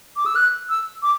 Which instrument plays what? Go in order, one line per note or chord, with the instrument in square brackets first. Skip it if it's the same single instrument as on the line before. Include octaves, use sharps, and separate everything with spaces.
[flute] D6
E6
F#6
E6
D6